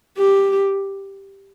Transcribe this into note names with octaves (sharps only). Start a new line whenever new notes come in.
G4